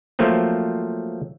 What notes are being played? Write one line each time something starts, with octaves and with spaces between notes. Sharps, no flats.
F3 F#3 A3 A#3 C4